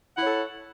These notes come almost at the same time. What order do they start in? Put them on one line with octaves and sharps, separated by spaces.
F#5 E4 C#5 A4